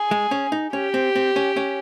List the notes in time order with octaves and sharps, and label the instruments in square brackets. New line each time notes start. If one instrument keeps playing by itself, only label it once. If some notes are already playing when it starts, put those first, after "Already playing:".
Already playing: [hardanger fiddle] G#4
[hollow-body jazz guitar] G#3
C#4
D#4
[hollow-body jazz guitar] C#4 [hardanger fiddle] G4
[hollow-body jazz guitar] C4
C4
C#4
C#4